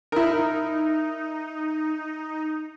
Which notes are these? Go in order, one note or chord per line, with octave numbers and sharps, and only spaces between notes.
D#4 E4 A#4